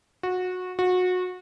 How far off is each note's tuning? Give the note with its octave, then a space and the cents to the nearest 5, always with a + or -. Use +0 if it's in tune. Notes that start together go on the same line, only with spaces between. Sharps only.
F#4 -20
F#4 -25